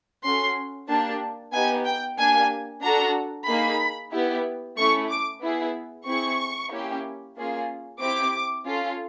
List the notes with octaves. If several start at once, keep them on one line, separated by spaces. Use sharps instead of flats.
C#4 F#4 A4 C6
A#3 D4 G4 A5
B3 D#4 G4 G#5
G5
A#3 D4 G4 G#5
D4 F#4 A4 A#5
A#3 D#4 G#4 B5
B3 E4 G4
A3 C#4 E4 C#6
D6
B3 E4 G#4
C4 E4 G#4 C#6
A#3 C#4 E4 G4
A#3 C#4 F4 G#4
C4 E4 G4 D6
C#4 F4 A4